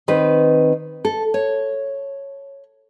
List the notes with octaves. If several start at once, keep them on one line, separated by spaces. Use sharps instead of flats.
D#3 C4 B4
A4
C#5